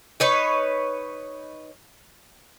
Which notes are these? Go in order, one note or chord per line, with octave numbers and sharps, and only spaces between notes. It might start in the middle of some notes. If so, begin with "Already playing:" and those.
D#4 B4 C#5